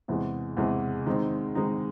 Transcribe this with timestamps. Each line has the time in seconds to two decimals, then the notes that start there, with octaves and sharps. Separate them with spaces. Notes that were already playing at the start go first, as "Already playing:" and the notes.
0.08 E2 C3 E3 G#3
0.57 E2 C3 E3 G#3
1.06 D#3 G#3 C4 D#4
1.55 D#3 G#3 C4 D#4